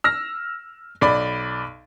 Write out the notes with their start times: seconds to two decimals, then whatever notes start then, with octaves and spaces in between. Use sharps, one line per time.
0.04 E6 F6 A#6
1.01 B1 D5 B5